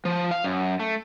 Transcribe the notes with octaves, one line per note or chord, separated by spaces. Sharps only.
F3
F5
F#2
A3